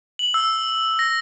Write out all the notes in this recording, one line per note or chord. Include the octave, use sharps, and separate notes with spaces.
F#7
E6
A#6